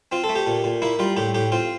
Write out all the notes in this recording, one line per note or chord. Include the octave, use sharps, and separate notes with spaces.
C4 F4
A4
A3
G4
A#2
A#2
A#3 E4
G3 F4
A2 G4
A2 G4
C4 F4